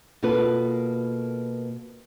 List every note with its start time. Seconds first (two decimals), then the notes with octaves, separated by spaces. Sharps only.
0.23 B2 A#3 F4 A4 B4